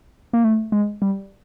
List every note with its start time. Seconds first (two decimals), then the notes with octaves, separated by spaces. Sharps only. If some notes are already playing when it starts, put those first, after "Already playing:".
0.33 A#3
0.44 A3
0.72 G#3
1.02 G3